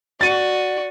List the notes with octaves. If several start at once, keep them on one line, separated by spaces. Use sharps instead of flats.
F#4 D5 A6 D#7